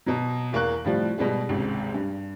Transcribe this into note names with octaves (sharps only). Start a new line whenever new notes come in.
B2 F#3
E2 A#3 C#6 F#6
A2 C3 F3 G3
G#2 B2 G3 G#3
G#1 C#2 G#2 C3
G2